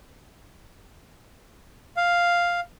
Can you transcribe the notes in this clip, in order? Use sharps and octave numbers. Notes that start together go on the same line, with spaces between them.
F5